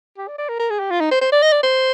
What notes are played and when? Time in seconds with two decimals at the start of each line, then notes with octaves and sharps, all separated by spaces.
0.18 G4
0.28 D5
0.38 D5
0.49 A#4
0.59 A#4
0.70 G#4
0.80 G4
0.90 F4
1.00 D#4
1.11 C5
1.21 C5
1.32 D5
1.43 D#5
1.52 D5
1.63 C5